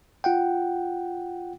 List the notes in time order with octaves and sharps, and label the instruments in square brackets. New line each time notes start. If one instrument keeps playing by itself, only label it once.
[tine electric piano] F4 F#5 G5